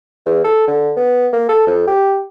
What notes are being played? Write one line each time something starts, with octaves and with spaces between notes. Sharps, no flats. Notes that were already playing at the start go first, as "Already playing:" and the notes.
E2
A4
D3
B3
A#3
A4
F2
G4